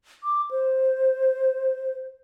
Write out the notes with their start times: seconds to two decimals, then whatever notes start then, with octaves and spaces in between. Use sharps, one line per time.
0.23 D6
0.51 C5